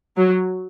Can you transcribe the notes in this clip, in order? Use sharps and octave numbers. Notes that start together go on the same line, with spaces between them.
F#3